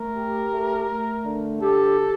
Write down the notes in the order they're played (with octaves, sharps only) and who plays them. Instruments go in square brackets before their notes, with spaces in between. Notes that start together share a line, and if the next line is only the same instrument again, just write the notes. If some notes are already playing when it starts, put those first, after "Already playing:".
Already playing: [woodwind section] A3 [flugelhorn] A#4
[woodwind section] G4
A3
A3
D3
[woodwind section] G4 [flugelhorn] A4
[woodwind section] G4